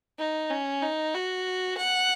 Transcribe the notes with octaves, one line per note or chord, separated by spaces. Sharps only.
D#4
C#4
D#4
F#4
F#5